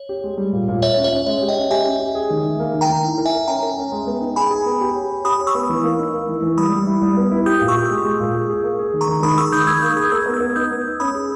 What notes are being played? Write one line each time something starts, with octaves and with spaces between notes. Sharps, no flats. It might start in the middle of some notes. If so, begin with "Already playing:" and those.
Already playing: C#5
G4
G#3
G3
A#2
A#2
A#2 C#5 E5
C#4
C#5 E5
C#4
G#3 C#5 E5
G4
D#5 G5
C#4
G4 E5 G#5
C#4
G4
G#4
D#3
D#3
A#3
D#3
G5 A#5
D#3
E4
A#4
E5 G#5
A#4
C#4 G5 A#5
A#4
C#4
G#3
B3
D#4
G#4 G#5 B5
G#4
B3
G4
C#5
C#5
G4 B5 D#6
C#5
C#6 E6
B3
E3
A#3
D#4
A#3
E3
E3
G3 B5 D#6
G3
E4
G3
B3
E4
G4 D#6 G6
A#2
C#6 E6
G4
G#3
G#3
A#2
G#4
G#4
A#3
G#4
D#3
A#5 C#6
D#3
D#3 B5 D#6
G#4 C#6 E6
D#3 D#6 G6
D#3 E6 G#6
A#3 D#6 G6
G#4 D#6 G6
A#4 E6 G#6
B3
E6 G#6
B3
D#4 D#6 G6
B3
B3
C#4 B5 D#6
G#4